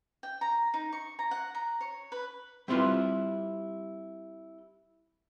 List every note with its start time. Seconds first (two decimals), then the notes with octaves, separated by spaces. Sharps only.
0.23 G5
0.41 A#5
0.74 D#4
0.92 C#6
1.19 A#5
1.31 F#5
1.55 A#5
1.81 C#5
2.12 B4
2.68 G3 C4 E4 F4 G4 B4